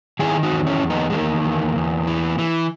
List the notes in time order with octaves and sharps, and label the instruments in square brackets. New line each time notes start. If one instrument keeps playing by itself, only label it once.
[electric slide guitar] D#3 E4 G#4
D#4 F#4
E2
C#4 E4
E2
B3 D#4
G#3
D#3 A#3
E2
E2
E3
E3